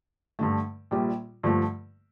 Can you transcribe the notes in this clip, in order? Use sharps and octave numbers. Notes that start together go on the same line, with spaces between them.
G2 D3 A3
A#1 A#2 G3
G2 D3 F3 A3